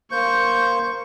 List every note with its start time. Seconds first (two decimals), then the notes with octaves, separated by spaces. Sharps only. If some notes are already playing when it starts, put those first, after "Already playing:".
0.12 A#3 C5 C#6 G6